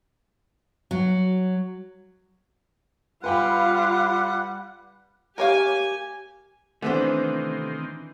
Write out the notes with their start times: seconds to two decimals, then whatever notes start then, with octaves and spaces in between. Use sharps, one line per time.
0.91 F#3
3.24 G3 F4 B4 F#5 G5 B5
5.38 G4 A#4 C#5 F5 G#5
6.82 C3 D#3 E3 A3 B3 C4 D4 C5